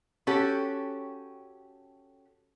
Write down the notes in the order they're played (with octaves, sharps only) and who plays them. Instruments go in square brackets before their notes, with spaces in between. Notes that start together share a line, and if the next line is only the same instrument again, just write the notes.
[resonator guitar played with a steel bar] C#4 F#4 G4 A4 C#5